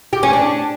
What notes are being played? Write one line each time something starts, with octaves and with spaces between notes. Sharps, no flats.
G4
C#4
D4